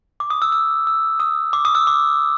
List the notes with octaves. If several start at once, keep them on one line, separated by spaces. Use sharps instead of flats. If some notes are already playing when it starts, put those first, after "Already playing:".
D6
D#6
E6
E6
E6
D#6
D6
D#6
E6
D6